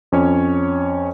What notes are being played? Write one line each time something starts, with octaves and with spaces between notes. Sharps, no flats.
F2 C#4 C#5